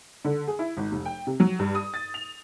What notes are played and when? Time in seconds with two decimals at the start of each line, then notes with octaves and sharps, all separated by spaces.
0.25 D3
0.47 G#4
0.59 E4
0.77 G#1
0.92 F1
1.05 G5
1.27 C3
1.40 F#3
1.59 G2
1.75 D#6
1.94 A6
2.14 F7